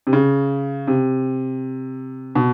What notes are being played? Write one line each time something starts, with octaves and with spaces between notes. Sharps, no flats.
C3
C#3
C3
B2